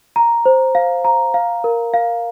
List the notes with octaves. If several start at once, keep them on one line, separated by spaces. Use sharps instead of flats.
A#5
C5
F5
A#5
F5
A#4
F5